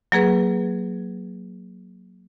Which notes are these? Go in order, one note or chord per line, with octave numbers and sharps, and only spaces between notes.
F#3 A#3 G#4 B4